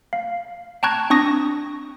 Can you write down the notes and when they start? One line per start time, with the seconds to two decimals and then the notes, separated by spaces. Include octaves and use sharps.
0.13 F5
0.83 G5 A5 A#5 C#6 F#6 G#6
1.10 C4 D4 C#6 D#6 A#6